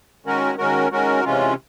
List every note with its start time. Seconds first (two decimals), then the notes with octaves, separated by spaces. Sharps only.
0.25 D#3 G#3 C#4 F#4 A#4
0.58 D#3 G#3 C#4 F#4 A#4
0.91 D#3 G#3 C#4 F#4 A#4
1.24 C3 E3 G#3 C#4 F4